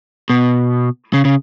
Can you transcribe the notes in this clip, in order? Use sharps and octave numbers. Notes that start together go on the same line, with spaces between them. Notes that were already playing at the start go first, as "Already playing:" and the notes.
B2
C#3
C#3